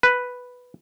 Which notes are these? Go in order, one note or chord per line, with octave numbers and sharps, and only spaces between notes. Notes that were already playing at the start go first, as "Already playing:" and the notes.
B4